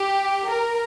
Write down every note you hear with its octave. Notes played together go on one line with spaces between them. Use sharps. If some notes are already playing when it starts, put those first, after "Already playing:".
Already playing: G4
A#4